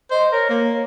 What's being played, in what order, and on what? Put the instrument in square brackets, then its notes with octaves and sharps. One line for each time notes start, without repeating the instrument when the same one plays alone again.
[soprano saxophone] C5 [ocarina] D#5
[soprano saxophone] A#4 [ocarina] C#5
[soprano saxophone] A#3